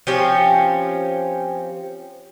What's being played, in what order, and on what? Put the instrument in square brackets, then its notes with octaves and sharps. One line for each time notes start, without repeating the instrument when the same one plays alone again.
[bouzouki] F3 C4 C#4 G4